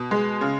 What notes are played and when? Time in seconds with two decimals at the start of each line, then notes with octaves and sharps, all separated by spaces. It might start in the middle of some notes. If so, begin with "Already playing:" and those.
Already playing: B2
0.11 G#3
0.41 C#3